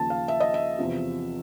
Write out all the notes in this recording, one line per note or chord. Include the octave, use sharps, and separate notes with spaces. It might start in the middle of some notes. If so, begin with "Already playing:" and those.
Already playing: D#2 C#3 F3 A5
F5
E5
D#5
E5
E2 C3 F3